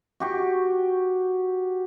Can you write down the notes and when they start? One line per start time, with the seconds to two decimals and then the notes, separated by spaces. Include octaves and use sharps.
0.20 F#4 G4 C#6